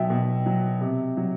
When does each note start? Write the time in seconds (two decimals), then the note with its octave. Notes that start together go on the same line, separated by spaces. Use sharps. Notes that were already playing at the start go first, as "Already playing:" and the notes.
Already playing: B2 F#3 E5 G5
0.10 B2
0.46 F#3
0.81 C3
1.17 F#3